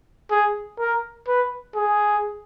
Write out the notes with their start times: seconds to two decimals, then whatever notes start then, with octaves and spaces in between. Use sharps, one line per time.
0.31 G#4
0.79 A#4
1.28 B4
1.76 G#4